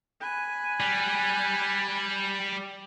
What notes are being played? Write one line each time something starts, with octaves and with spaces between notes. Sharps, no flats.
G#5 B5 F#6
G3